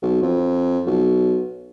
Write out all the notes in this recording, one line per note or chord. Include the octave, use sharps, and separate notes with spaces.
B1
F2
B1